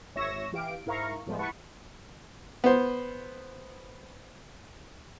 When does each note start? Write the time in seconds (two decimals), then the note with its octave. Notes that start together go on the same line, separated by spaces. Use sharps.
0.15 G#1 C#5 E5 C#6 A#6 E7
0.52 E3 G4 F5 D7
0.86 G#2 E4 A#4 F5 A#5 C#6
1.26 A2 F3 G3 G#3 B3
1.39 E4 B4 F#5 A5 C#6
2.64 B3 C5